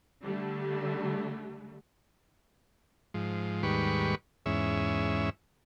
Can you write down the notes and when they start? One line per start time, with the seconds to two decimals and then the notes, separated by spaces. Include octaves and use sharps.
0.24 D3 G3 A3
3.14 G#2 F3
3.63 D#2 G#2 G3 B4 C#6
4.46 E2 G#2 C#4 E5